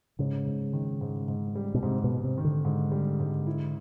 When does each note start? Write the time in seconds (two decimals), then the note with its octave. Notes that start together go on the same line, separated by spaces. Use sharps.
0.19 G#2 C#3
0.46 G#2
0.73 D#3
1.01 G#2
1.28 G#2
1.56 G3
1.74 B2
1.83 G#2 C3
2.04 B2
2.10 G#2
2.24 C3
2.38 D#3
2.44 D3
2.65 G#2
2.92 G3
3.19 G#2
3.47 E4